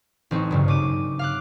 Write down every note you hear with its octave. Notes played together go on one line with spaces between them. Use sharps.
A1 C4 D#4 C#6
B1 G2 C#3
C#3 D6 D#7
F5 D6 F#6